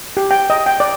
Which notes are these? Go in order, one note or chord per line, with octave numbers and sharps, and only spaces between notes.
G4
G5
D#5
G5
D5